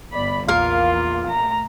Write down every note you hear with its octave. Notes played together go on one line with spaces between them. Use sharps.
G1 D5 B5
A#1 E2 A#3 F4 A#4 F5
A3 A#5